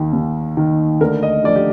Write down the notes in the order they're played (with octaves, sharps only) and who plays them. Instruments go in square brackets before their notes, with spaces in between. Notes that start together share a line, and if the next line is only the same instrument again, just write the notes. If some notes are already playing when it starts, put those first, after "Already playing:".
Already playing: [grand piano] D#2 D#3
D#2
D#3
D2 A#4
D#5
D3 F3 D5
G4